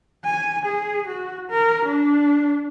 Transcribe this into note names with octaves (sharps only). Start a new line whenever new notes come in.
G#5
G#4
F#4
A#4
D4